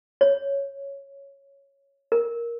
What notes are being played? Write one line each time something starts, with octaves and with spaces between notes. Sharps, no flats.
C#5
A#4